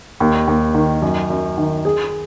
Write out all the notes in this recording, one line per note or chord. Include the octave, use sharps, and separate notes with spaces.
D#2
D#2
D#3
F#2
F#2
D#3
G#4